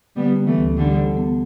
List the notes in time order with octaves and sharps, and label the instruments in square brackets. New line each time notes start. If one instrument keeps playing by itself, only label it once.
[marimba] D3 [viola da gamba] G3 B3
[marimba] B3
[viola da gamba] E3 A3
[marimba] D2
[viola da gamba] D3 G3 [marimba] D4
[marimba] D3
B3